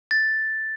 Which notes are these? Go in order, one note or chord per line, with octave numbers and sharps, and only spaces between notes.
A6